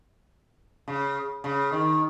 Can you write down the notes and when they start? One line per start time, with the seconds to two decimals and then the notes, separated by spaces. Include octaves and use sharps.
0.88 C#3
1.44 C#3
1.72 D#3